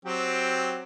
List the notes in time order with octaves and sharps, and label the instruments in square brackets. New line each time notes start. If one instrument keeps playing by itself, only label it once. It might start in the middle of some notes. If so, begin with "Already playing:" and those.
[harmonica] F#3 C4 G4